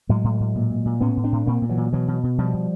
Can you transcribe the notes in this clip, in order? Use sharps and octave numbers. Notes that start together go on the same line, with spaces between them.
A2 F#3 G#3
A2
A2
A#2
A#2
A#2
A2 B3 C#4
A2
C4 D4
A2
A#2 A#3 C4
A#2
E3 F#3
A#2
B2 E3 F#3
B2
B2
B2 F3 G3
B2